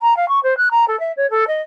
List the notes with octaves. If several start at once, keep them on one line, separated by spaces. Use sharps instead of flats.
A#5
F5
C#6
C5
F#6
A#5
A4
E5
C#5
A4
D#5